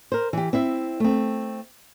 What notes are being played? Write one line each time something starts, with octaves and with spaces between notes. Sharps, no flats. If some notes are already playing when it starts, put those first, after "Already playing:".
A#4 C5
E3 G4
C4 E4 E5
A3 C4